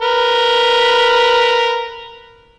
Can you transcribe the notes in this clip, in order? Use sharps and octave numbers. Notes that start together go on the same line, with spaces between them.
A#4 B4